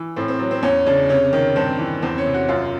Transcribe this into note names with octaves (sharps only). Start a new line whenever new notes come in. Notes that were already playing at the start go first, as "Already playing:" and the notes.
Already playing: E3
A2 C4
C4
F#3
C4
E2 C#4
C#3 D4
C3 C#4
D#3
G2 C4
E3
E2 C4
C#4
C3
F#4
F#2 F4